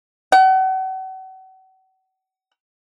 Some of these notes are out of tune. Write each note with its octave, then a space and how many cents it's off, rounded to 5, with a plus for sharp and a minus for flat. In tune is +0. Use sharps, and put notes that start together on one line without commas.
F#5 +40